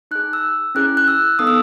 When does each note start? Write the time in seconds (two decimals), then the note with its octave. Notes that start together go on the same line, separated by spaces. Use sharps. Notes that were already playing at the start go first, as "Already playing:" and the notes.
0.11 D#4 F#6
0.15 G#4
0.33 E6
0.75 C#4 E4 G#4 F#6
0.97 F#6
1.08 E6
1.39 B3 D#4 A4 D#6
1.47 E6